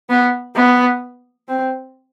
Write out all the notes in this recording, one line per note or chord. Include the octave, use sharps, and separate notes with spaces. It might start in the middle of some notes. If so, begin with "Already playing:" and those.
B3
B3
C4